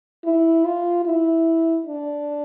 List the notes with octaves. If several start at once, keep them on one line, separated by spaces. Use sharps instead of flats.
E4
F4
E4
D4